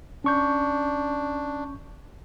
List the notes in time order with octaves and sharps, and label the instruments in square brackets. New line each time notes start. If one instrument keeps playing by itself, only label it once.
[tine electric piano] C#4 C#6 G6 [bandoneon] D4